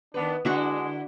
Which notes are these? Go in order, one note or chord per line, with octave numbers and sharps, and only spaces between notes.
D#3 B3 D4 B4
D3 G#3 D4 E4 F#4 C#6